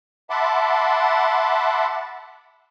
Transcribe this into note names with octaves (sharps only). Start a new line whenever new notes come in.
E5 F#5 A5 B5 C6 D6